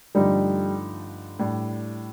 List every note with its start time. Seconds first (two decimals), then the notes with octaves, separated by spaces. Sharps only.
0.15 G2 D3 F3 G3 A3 D#4
1.39 A2 G3 D4